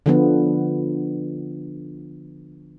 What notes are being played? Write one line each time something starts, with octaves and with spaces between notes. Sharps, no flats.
D3 F3 B3